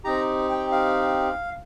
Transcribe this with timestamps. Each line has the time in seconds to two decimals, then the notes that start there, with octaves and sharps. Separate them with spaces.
0.04 C4 D#4 G4 A#5
0.49 G5
0.72 F5